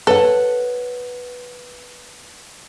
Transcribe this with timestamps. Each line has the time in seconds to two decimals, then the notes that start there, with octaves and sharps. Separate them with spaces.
0.07 A4 B4 C#5 F#5